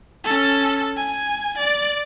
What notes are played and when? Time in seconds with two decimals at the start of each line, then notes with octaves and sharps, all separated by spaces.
0.24 C#4 A4
0.96 G#5
1.57 D5